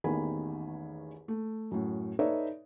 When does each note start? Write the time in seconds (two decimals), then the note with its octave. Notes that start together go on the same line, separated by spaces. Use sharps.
0.04 A1 E2 D#3 A#3 G#5 B5
1.28 A3
1.71 F#2 A2
2.19 D#4 A4 B4 C#5 D5 E5